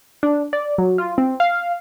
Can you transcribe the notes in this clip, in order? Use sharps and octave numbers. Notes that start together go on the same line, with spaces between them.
D4
D5
F#3
F4
C4
F5